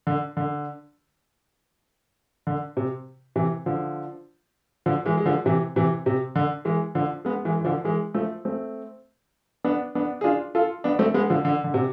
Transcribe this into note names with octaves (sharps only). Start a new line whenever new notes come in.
D3
D3
D3
C3
C3 E3
D3 F3
D3 F3
E3 G#3
G#3
D3 F3
C3 E3
C3 E3
C3
D3
E3 G#3
D3 F3
G#3 B3
E3 G#3
E3
D3 F3
E3 G#3
F3 A3
A3 C4
B3 D4
B3 D4
G#4
D4 F4
F4 A4
B3 D4
A3 C4
G#3 B3
D3 F3
D3
D3
C3